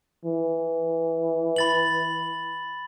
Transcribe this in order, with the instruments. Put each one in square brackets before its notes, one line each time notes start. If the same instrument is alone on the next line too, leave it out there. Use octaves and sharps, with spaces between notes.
[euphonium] E3
[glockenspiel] B5 A6 F#7